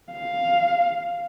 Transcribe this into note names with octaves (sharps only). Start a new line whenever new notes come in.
F5